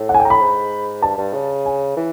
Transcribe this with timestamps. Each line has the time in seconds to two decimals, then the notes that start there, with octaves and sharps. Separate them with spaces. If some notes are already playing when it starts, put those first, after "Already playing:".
Already playing: A2
0.09 F#5
0.14 G#5
0.20 G5
0.25 A#5
0.30 B5
0.40 G#2
1.02 G2 A5
1.18 G2
1.34 C#3
1.66 G#5
1.97 E3